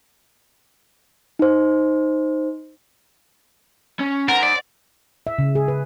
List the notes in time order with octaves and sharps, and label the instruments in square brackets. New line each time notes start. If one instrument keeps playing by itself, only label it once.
[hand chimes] D#4 C5
[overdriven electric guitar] C#4
[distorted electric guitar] A#4 [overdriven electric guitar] C5 F#5
[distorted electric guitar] D5
[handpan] E5
C#3
G#4
B4